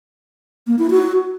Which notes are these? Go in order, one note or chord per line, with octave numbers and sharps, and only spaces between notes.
A#3
E4
F#4